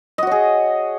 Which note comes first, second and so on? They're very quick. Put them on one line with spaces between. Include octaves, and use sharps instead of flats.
D#5 F#4 C#5 G#4